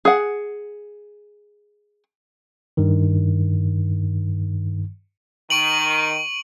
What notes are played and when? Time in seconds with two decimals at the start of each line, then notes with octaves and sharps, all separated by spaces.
0.05 G#4 F#5
2.77 G2 D#3
5.50 D#3 C#6 D7 D#7 F#7